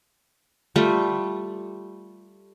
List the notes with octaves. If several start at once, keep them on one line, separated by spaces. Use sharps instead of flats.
G3 A3 F4